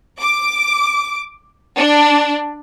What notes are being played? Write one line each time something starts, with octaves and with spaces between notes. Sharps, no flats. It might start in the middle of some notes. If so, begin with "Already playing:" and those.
D6
D4